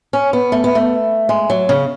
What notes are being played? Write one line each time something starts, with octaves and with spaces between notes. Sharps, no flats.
C#4
B3
A3
B3
A3
G#3
F#3
C#3